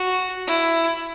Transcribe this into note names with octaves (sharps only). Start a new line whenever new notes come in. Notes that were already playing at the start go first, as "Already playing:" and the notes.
Already playing: F#4
E4